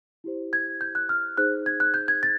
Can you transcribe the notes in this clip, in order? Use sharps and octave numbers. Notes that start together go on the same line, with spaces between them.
E4 G4 C5
G#6
G6
F#6
F6
D#4 G#4 C5 F#6
G#6
F#6
G6
G#6
A6